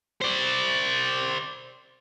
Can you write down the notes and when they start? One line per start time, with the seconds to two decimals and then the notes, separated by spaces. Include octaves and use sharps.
0.21 C5 D5